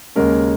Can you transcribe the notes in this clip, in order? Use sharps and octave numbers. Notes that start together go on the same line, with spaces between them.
D#2 C#3 G#3 C#4 A#4